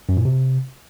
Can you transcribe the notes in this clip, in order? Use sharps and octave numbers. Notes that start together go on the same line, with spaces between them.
F#2
A#2
C3